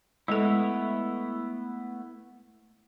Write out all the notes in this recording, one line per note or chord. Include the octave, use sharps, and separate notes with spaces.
G#3 A3 B3 E4 A4